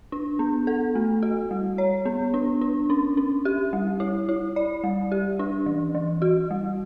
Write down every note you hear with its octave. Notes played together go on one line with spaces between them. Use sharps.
D4
B3
A4
A3
F#4
G3
C#5
B3
D4
D4
C#4
C#4
G4
G3
E4
E4
D5
G3
G4
D4
E3
E3
F#4
G3